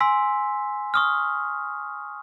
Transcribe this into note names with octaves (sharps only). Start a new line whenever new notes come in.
G#5 C6 E6 B6
C#6 D#6 F6